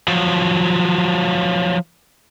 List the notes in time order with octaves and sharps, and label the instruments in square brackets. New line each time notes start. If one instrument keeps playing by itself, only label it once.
[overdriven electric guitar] F3 F#3